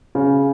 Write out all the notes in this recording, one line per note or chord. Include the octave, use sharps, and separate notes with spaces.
C#3